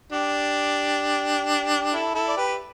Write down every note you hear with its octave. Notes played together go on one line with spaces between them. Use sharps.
D4 G4
E4 A4
E4 A4
D5
G4 B4